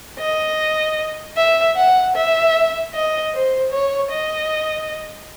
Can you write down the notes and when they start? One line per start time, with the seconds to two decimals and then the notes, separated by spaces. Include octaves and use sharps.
0.19 D#5
1.36 E5
1.76 F#5
2.15 E5
2.93 D#5
3.33 C5
3.72 C#5
4.11 D#5